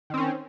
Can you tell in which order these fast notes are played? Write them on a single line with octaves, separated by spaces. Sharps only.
D#3 C4 C#4